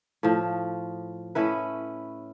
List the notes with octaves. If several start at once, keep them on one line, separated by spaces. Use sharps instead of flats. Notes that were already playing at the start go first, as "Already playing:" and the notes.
A2 F3
A2 C#4 E4 B4